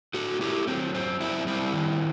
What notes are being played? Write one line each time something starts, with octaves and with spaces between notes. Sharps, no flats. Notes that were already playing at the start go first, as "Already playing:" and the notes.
A2 F#4 A4
A3 E4 G4
F#3 C4
F#2 C4
F#2 C4 E4
G3 C4 E4
D#3